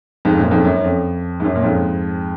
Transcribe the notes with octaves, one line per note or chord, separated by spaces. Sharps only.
F2 G#2
F#2 A#2
F2 G#2
F#2
F2
G#2
F#2
A#2
F2 G#2